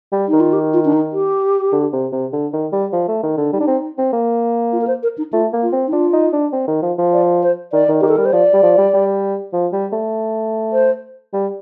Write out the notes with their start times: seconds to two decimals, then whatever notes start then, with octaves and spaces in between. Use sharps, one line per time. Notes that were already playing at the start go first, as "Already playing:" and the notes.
0.12 G3
0.28 D#4
0.33 D#3
0.40 F4
0.53 G4
0.73 F4
0.85 D4
0.93 D#4
1.13 G4
1.73 D3
1.93 C3
2.12 C3
2.33 D3
2.53 D#3
2.72 G3
2.93 F3
3.08 A3
3.23 D#3
3.37 D3
3.53 G3 D#4
3.61 D4
3.67 C4
3.98 C4
4.13 A#3
4.73 F4
4.81 A#4
4.87 C5
5.03 A#4
5.18 D#4
5.33 A3 F4
5.53 A#3
5.63 F4
5.73 C4
5.87 D#4
5.93 D4 F4
6.13 D#4
6.33 D4
6.53 C4
6.68 D#3
6.82 F3
6.98 F3
7.13 D5
7.43 C5
7.73 D#3 D5
7.88 D#3
8.01 D#3 G4
8.09 A4
8.17 G3 A#4
8.25 C5
8.33 F3 D5
8.54 G3
8.63 F3
8.78 G3
8.93 G3
9.53 F3
9.73 G3
9.93 A3
10.73 C5
11.33 G3